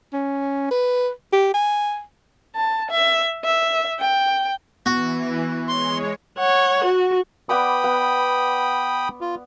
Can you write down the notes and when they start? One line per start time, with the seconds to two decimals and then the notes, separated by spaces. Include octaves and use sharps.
0.13 C#4
0.71 B4
1.33 G4
1.54 G#5
2.55 A5
2.91 E5
3.44 E5
4.00 G5
4.86 E3 B3 F#4
5.68 G#3 C#5 C6
6.38 C#5 F#5
6.84 F#4
7.49 B3 D5 G5 B5 D6 D#6
7.84 B3
9.21 F4